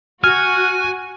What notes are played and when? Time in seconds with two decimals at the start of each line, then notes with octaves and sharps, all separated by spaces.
0.24 F#4 G#5 F6